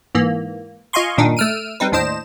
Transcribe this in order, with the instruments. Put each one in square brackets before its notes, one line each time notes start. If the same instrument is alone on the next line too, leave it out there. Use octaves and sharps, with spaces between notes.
[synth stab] G#2 E3 A#3
F4 D#5 F5 G#5 C6 C#6
G2 A#2 D#3 D4 D#4
A3 E6 F6 D7 D#7
G3 C4 D#4 B4
D#2 A2 D4 C5 D#5 E7